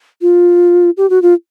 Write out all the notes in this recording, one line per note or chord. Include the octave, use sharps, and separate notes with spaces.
F4
G4
F#4
F4